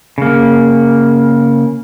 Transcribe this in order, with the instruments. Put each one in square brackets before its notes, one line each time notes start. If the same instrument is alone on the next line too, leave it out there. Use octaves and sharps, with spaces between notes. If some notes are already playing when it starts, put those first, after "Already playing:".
[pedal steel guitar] C#3 A#3